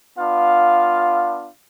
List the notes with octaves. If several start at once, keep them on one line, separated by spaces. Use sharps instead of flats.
B3 D4 F4 F5